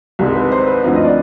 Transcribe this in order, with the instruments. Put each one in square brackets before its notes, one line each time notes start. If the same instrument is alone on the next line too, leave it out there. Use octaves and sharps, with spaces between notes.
[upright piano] C2 C3 D#3 G#3
B4
C5
B4
D2 D3 F3 C4 D#4 F5
D#5
D5